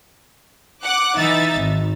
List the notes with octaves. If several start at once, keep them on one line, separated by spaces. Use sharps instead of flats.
F#5 D6 F#6
E3 D#4 E5 A6
G#1